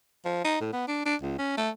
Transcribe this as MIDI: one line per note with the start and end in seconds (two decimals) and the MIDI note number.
0.25 0.42 53
0.44 0.57 63
0.61 0.69 45
0.73 0.87 59
0.88 1.02 62
1.05 1.15 62
1.22 1.37 37
1.38 1.52 61
1.57 1.70 57